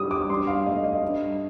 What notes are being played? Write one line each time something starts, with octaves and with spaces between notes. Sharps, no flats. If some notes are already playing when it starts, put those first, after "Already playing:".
Already playing: G2 G3 D#6
D6
G2 C6
F5
A3 D#5
D#5
G2